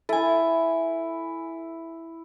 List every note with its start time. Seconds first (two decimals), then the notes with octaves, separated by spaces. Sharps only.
0.09 E4 A4 G#5